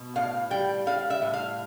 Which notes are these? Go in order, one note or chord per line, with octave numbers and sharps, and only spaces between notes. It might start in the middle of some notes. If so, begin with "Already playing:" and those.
Already playing: B2
A2 F5
G3 G5
G3 F5
E5
A2
F5